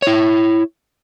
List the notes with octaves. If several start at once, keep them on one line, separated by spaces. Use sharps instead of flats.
E4 C#5